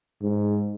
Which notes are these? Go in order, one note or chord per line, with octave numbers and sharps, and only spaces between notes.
G#2